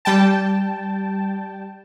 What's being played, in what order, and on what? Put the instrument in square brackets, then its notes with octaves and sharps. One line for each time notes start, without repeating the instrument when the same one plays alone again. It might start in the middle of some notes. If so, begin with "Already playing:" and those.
[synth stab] G3 G5 A5